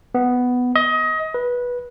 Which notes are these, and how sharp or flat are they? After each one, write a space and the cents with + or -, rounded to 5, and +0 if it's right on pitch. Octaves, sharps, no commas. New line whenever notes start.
B3 +5
D#5 +25
B4 -15